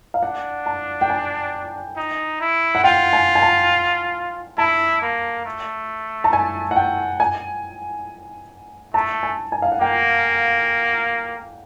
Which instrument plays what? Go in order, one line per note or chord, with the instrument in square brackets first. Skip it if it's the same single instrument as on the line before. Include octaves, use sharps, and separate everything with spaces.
[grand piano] F5
[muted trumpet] D4 [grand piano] F#5
[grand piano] A5
G5
G#5
[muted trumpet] D#4
E4
[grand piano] F#5
[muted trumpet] F4 [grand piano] G5
[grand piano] G#5
G#5
A5
[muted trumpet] E4 [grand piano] A5
[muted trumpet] A#3
A3
[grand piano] A5
G#5
F#5
G5
G#5
[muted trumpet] A3 [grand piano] A5
[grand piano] G#5
G#5
F5
F#5
[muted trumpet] A#3 [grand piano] G5